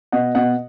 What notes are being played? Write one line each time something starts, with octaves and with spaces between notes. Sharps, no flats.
B2 D#5 F#5
B2 D#5 F#5